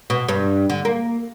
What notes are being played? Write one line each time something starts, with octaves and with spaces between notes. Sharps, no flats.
B2
G2
D3
A#3